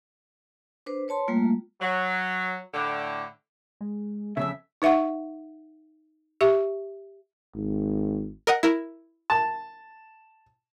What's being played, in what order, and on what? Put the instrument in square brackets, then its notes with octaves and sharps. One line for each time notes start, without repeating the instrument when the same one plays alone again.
[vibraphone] D4 B4 C5
B4 C#5 A5 C6
G3 A3 A#3 F4
[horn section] F#3
A2 D3
[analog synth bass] G#3
[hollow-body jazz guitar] F2 G#2 C#3 [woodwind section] E5
[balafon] D#4 B4 E5 F#5 C#6
G4 E5 C#6
[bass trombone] G#1
[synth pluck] A#4 D#5 F#5
E4 A#4
[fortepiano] A5